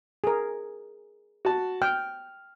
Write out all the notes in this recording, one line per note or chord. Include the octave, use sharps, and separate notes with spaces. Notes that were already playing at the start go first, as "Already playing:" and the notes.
G#4 A#4
F#4 A5
G5 F6